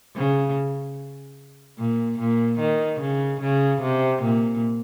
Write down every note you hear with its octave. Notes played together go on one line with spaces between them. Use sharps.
C#3
A#2
A#2
D#3
C#3
C#3
C3
A#2